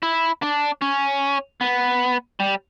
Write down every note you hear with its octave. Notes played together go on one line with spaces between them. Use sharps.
E4
D4
C#4
B3
G3